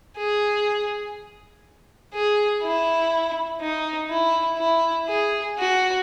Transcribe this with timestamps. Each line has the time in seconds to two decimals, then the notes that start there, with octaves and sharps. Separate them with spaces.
0.17 G#4
2.13 G#4
2.63 E4
3.60 D#4
4.10 E4
4.59 E4
5.08 G#4
5.58 F#4